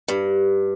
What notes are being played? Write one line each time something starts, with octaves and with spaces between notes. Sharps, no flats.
G2